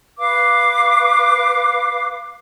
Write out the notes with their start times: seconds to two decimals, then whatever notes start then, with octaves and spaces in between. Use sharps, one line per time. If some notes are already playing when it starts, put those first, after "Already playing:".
0.18 B4 F5 D6